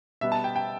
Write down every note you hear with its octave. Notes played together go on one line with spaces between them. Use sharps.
B2 G3 B3 E5
A5
G5
G5